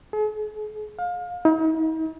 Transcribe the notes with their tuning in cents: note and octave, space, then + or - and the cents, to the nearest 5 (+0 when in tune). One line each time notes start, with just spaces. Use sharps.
G#4 +45
F5 +30
D#4 +45